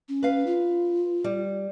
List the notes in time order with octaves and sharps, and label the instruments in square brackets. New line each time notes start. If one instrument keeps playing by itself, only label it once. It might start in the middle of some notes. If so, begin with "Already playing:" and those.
[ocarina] C#4
[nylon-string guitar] B4 F5
[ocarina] F4
[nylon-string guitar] G3